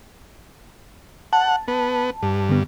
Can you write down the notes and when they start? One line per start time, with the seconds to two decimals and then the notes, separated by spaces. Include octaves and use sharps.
1.33 F#5 A5
1.68 B3
2.23 G2
2.49 D3 B3